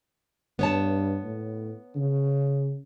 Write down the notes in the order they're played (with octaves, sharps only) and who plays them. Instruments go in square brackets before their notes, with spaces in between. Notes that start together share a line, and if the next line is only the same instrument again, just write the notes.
[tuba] G2 [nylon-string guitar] B3 C#5 A5
[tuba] A2
C#3